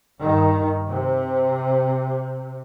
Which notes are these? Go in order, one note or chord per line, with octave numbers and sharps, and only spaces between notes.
G2 D#3
C3